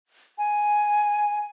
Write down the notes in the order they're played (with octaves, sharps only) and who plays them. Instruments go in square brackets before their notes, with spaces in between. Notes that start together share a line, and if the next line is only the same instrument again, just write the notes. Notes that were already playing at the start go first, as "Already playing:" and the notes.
[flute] G#5